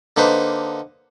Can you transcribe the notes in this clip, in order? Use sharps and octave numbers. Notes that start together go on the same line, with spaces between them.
D3 A#3 D#4 B4 C5